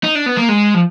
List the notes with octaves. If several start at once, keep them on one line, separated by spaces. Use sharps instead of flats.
D#4
D4
B3
A#3
G#3
F3